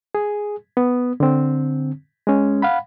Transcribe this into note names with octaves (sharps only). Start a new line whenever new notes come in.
G#4
B3
D3 C4
G#3 C#4
F5 F#5 B5